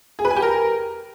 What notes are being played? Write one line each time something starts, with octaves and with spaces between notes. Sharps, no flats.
G#4
B4
G#5
G4
A#4